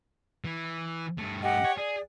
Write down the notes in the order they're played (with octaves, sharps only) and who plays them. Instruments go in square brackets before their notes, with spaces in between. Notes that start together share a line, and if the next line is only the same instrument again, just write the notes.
[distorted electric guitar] E3
G2 A3
[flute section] G4 D#5 F#5
[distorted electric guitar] C#5
[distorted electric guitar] G#4 [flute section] D5